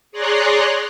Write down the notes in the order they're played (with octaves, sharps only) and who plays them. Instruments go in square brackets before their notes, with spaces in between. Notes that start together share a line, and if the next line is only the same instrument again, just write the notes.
[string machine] G#4 C#5 D5 A#5 C6 F#6